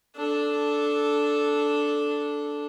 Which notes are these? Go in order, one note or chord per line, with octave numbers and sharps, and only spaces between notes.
D4 A4